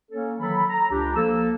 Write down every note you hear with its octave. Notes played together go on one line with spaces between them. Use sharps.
A#3 C#4 A4 C#5
D#3 E3 F#3 A4 B5
A#5
C#2 D4 G4
F3 A#3 A4 E6